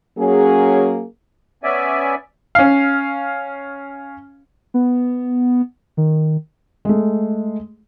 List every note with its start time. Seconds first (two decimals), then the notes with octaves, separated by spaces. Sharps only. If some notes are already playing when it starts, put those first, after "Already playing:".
0.18 F#3 A#3 C#4 G#4
1.64 B3 C#4 D5 E5 G#5
2.55 C#4 F5
4.74 B3
5.97 D#3
6.85 G#3 A3